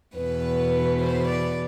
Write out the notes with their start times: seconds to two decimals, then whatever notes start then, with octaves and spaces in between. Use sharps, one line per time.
0.16 E2 B2 B3 B4
1.01 C5
1.29 D5